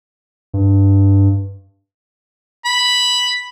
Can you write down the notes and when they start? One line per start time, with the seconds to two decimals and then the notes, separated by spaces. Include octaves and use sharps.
0.54 G2
2.65 B5